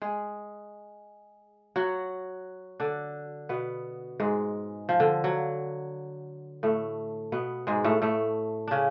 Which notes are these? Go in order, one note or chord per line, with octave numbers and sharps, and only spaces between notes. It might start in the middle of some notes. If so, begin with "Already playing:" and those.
G#3 G#4
F#3 F#4
D3 D4
B2 B3
G#2 G#3
F3
D3
F#3
A2 A3
B2 B3
G#2 G#3
A2 A3
A2 A3
C#3 C#4 D4